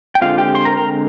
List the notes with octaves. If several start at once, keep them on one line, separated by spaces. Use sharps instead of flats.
G5
D3 G#3 C4 F4 F5
G4 G5
C5 C6
A#4 A#5
A#4 A#5